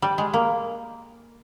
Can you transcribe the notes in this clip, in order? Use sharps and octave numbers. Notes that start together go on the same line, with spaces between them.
G3
G#3
A#3